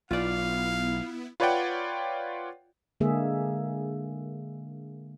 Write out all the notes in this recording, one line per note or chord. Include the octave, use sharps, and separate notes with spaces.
B1 B3 E4 F4 D5 F5
F4 B4 C#5 D5 F#5 G5
D3 G#3 A#3 G#4 E5